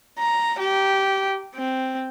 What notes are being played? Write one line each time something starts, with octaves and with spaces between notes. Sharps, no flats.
A#5
G4
C4